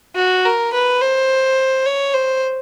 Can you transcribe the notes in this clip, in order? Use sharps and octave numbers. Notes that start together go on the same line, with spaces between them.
F#4
A#4
B4
C5
C#5
C5